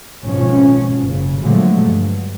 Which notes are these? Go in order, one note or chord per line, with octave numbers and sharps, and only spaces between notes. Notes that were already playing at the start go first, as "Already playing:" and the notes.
G#1 G#2 B2 F3 C#4
F#1 C#3
A#2 D3 F3 F#3 G#3 A3
G2